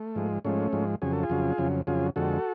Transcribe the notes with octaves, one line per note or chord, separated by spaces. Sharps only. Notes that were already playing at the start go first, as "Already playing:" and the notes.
Already playing: A3
G#2 F3 G#3
G#2 F3 G#3 A3 C#4
G#2 F3 G#3
F2 C#3 F#3 G#4
A4
F4 G#4
F2 C#3 F#3
F2 C#3 F#3
F2 C#3 F#3 F4 G#4
F2 D3 G#3 F#4 A4